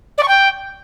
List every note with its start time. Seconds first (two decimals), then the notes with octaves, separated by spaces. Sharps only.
0.18 D5
0.23 C#6
0.28 G5